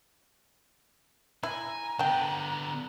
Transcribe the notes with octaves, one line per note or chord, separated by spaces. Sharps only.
E4 G#5 A#5
D3 B3 G5 A5